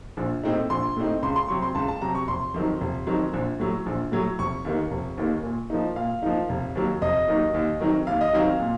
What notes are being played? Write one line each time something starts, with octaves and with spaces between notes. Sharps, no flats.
A#1
A2 A3 C4 D#4
A#1 C6
A2 A3 C4 D#4
C#2 C6
C6
C3 F#3 C4 C#6
C6
C#2 A5
A5
C3 F#3 C4 A#5
C#6
F1 C6
F2 D#3 F#3
F1
F2 D#3 F#3
A#1
A2 F#3
A#1
A2 F#3
F1 C#6
D#2 D#3 A#3
F1
D#2 D#3 A#3
A#2
F3 A#3 D#4
A#2 F5
F3 A#3 D#4
F1
D#2 D#3 F#3
F1 D#5
D#2 D#3 F#3
D#2
D#3 F#3 C4 D#4
D#2 F5
D#5
D#3 F#3 C4 D#4 F5
A#2